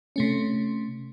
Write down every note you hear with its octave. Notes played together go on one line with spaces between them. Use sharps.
C3 A3 C#4